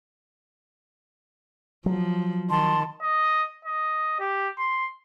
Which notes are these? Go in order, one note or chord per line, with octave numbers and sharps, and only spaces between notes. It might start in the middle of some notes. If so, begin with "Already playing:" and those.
F3 F#3
D#3 A5 C6
D#5
D#5
G4
C6